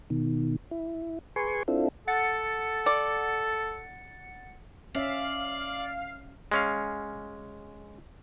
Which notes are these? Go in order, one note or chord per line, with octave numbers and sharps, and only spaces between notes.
B2 D#3
E4
G#4 B4 G#5 C6 C#6
C4 D4 E4 F4 A4
A4 F#5 A6 C#7
D5
C#4 D5 E5 F5
G#3 C#4 F5